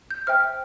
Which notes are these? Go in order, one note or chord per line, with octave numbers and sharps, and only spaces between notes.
G6
C5 E5 G5 F6